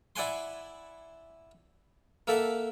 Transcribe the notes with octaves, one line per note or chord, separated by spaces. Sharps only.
E4 D5 F#5 G#5 C6
A#3 A4 E5 F#5